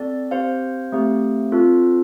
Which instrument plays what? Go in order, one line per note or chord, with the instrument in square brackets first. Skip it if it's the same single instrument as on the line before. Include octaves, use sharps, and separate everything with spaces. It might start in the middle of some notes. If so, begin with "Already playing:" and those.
Already playing: [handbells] C4 A4 D5
C4 G4 C5 F5
A3 C4 G4
C4 F4 A4